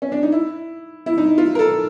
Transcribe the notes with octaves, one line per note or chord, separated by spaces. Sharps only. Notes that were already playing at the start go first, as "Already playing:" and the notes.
C#4
D4
D#4
E4
E4
D#4
F4
A#4
A4